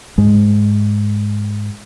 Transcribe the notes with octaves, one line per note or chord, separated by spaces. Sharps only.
G#2 G#3